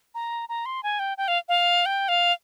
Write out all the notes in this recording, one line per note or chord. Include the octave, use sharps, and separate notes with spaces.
A#5
A#5
C6
G#5
G5
G5
F5
F5
G5
F5